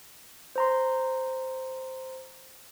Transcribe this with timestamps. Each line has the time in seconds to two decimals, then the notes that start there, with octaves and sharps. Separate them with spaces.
0.56 C5 A#5 C6